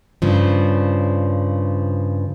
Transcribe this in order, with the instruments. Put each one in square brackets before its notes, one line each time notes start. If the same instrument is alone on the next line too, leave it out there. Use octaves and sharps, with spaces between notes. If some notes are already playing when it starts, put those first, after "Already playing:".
[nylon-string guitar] G2 C#3 F3